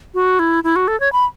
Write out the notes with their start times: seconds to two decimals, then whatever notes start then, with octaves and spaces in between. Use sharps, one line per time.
0.14 F#4
0.39 E4
0.64 E4
0.76 F#4
0.88 A4
1.00 C#5
1.13 B5